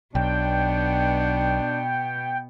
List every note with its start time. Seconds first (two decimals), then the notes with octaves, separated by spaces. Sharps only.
0.15 B1 B2 B3 D4 G5